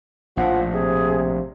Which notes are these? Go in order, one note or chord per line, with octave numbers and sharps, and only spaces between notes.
A#1 A2 F3 F#5
C3 G#4